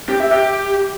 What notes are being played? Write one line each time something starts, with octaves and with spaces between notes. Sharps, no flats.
G4
E5
G4